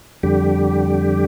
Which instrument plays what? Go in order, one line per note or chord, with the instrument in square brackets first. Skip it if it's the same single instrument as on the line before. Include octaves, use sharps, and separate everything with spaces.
[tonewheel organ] F2 D3 G3 G4